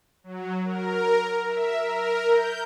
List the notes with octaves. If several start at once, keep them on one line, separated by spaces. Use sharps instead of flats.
F#3
A#4
E5
A#4
G6